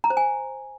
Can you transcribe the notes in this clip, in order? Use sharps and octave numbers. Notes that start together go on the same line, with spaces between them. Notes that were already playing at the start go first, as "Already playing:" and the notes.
A#5
C5
G#5